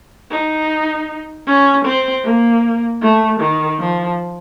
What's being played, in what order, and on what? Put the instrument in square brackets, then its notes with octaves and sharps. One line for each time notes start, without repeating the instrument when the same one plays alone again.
[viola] D#4
C#4
C4
A#3
A3
D#3
F3